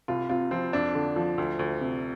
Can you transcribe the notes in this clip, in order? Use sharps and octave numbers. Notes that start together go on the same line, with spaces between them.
C2 F4
C3 F4
F3 C4
F2 D4
D3
F3
D2
D2
C3